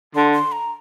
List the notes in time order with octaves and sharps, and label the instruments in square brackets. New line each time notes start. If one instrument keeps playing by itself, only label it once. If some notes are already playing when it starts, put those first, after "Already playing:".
[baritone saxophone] D3 [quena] C6
[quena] C6
A#5